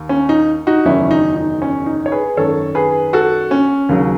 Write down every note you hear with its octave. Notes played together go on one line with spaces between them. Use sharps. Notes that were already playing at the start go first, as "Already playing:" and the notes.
Already playing: D#2 D#3
C#4
D#4
D#4 F#4
F#1 E2 D#3 F#3 C#4 E4
D#4
D#4
C#4
D#4
C#5
G#4 B4
G#1 F#2 D#3 A4 C#5
G#4 B4
F#4 A4
C#4
D#2 C#3 F#3